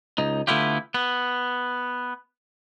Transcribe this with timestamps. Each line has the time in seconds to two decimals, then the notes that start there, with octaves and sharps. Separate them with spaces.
0.18 C#2 D#4
0.47 D3 A3 B3 E4 F4 G4
0.94 B3